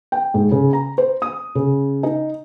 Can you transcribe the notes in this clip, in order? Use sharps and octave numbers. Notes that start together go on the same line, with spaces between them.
G5
G#2
C#3
A#5
C5
D#6
C#3
D#4